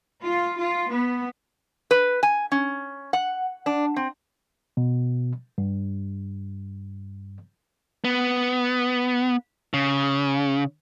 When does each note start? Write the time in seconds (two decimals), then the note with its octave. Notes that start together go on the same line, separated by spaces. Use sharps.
0.24 F4
0.58 F4
0.91 B3
1.91 B4
2.23 G#5
2.52 C#4
3.13 F#5
3.66 D4
3.96 C4
4.77 B2
5.58 G2
8.04 B3
9.74 C#3